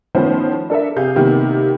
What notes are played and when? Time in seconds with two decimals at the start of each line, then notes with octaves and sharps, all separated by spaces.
0.15 D#3 F3 A3 B3 C#4 C5
0.70 D4 A4 A#4 E5
0.96 C3 G#4 F5 G6
1.16 C3 D#3 A#3 B3